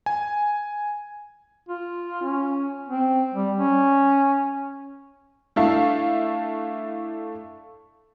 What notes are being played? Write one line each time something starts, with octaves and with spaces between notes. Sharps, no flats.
G#5
F4
C#4
C4
G3
C#4
A3 D4 E4 A4 E5 F5